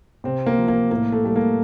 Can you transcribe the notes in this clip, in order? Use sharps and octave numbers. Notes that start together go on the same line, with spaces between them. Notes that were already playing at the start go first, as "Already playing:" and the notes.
C3 C4
A#3
F3
A#3
A2 A#3
A3
G3 A3
A#3